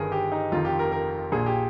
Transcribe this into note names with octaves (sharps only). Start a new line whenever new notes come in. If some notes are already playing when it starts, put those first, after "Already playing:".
Already playing: G1 G2 D#3 G#4 A#4
G4
D#4
F1 F2 D#3 F4
G4
A#4
A#4
A#1 A#2 G#4
G4